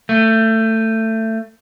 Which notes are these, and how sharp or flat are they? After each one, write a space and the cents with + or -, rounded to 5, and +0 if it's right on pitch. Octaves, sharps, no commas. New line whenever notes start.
A3 +20